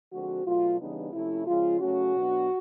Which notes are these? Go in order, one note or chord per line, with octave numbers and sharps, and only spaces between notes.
D3 F3 G#3 C4 F#4
B2 F#3 A3 F4
C#3 E3 G3 B3 D4 D#4
C3 F3 A3 C#4 E4
C#3 F3 G#3 F4
C#3 F#3 A3 C#4 F#4
B2 F#3 B3 D4